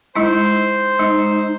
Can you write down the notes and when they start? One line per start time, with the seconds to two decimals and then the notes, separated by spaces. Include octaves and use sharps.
0.15 G#3 D#4 E4 C5
0.99 G#3 D#4